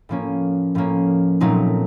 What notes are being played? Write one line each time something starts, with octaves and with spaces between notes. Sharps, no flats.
A2 F3 A#3 C#4
A2 F3 A#3 C#4
A#2 F#3 A3 C4 D#4